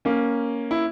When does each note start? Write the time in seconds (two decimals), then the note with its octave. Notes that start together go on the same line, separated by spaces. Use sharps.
0.05 A#3 C#4
0.71 E4